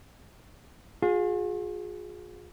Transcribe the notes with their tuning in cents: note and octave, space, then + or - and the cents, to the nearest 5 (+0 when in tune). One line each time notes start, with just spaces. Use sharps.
F4 +45 G#4 +0